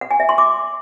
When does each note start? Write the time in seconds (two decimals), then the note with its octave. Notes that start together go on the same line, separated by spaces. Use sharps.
0.01 F#5
0.11 G#5
0.20 E5
0.29 C6
0.38 D6